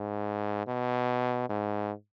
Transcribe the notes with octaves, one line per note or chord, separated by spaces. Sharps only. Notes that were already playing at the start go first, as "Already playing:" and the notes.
Already playing: G#2
B2
G#2